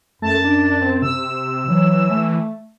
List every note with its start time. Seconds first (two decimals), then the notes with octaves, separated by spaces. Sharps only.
0.22 F#2 A3 A5
0.44 D4
0.81 C4
1.02 C3 E6
1.68 E3 F#3
2.10 A3